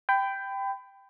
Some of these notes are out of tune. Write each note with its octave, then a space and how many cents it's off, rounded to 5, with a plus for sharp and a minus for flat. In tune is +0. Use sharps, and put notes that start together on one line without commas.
G5 +0 B5 +30